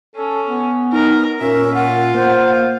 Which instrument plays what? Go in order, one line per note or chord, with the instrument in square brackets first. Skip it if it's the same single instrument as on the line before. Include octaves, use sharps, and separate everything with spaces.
[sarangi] C#4 [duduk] A4
[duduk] B3
[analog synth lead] D#4 [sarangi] A#4
[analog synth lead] A#2 [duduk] C#4 [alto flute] A#4 [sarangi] E5
[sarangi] F4 [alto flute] F#5
[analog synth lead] A#3 [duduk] C5